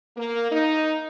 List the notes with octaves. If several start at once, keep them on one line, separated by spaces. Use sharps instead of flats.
A#3
D#4